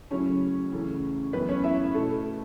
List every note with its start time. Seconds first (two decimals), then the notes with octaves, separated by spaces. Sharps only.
0.11 C#3 F#3 A3 C#4 E4 C#5
0.72 E2 C#3 E3 A3 C#4
1.33 F#2 E3 A3 B3 C#4 B4
1.49 C#4 C#5
1.64 E4 E5
1.94 B2 A3 E4 A4